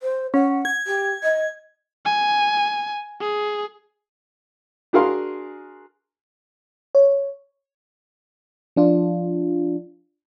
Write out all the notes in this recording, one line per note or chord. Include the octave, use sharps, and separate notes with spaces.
C5
C#4 F#5
G#6
G4
D#5
G#5
G#4
D4 F#4 G#4 A#4 F5 C6
C#5
F3 D4 F4